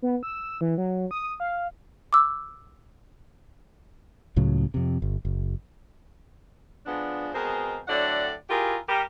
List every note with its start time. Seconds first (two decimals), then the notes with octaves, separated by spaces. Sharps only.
0.02 B3
0.23 E6
0.61 E3
0.78 F#3
1.11 D#6
1.40 F5
2.13 D6 E6
4.36 C#2 A2 C#3 F#3
4.74 F2 C3
5.02 G1
5.25 F#1
6.86 F3 G#3 B3 D4
7.34 B2 G#3 C4 G#4 A#4 C5
7.88 A2 D3 F#3 D4 D5 F#5
8.50 E4 F4 G4 G#4 A#4
8.88 G3 G4 A#4